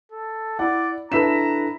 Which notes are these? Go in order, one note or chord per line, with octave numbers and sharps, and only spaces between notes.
A4
E4 D5 F#5
D4 E4 A4 B4 A#5 B6 E7